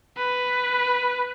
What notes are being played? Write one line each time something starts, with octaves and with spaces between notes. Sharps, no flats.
B4